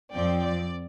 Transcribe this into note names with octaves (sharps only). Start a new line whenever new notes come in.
F2 F3 C4 D5 G5
D5